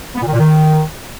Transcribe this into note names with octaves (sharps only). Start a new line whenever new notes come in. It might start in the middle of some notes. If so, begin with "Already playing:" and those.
B3
A#2
D#3
A#2
D#3